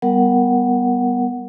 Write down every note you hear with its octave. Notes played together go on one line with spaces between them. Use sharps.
G3 B3 A#4 F#5